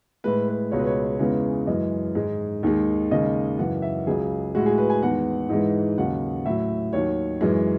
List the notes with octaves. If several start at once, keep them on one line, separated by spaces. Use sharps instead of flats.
A2 G#3 B4
B4
C#2 B2 G#3 C#5
B4
C#5
E2 C#3 E3 G#3
F#2 E3 G#3 D#5
G#2 D#3 G#3
D#2 D#3 G#3
D#2 C#3 G#3 D#5
F#2 C#3 E3 F#5
E5
C#2 C#3 F#3 G#4
A2 G#3 F#4
G#4
B4
G#5
E2 D#3 G#3 F#5
G#2 E3 G#3
D#2 C#3 F#3 F#5
A2 F#3 E5
D#2 D#3 F#3 C#5
F#2 E3 G#3